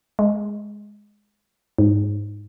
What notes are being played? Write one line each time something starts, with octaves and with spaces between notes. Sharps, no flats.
G#3
G#2